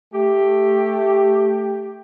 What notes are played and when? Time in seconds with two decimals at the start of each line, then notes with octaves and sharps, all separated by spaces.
0.14 A3 G4